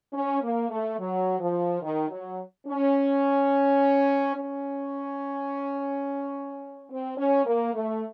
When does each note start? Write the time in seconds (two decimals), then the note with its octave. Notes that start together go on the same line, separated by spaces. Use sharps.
0.13 C#4
0.42 A#3
0.70 A3
0.98 F#3
1.40 F3
1.82 D#3
2.10 F#3
2.67 C#4
4.35 C#4
6.89 C4
7.17 C#4
7.45 A#3
7.74 A3